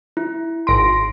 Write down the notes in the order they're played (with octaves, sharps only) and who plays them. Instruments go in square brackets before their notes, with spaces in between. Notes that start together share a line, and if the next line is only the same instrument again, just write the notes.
[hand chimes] E4
[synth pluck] G#1 A#6 D7 [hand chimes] C6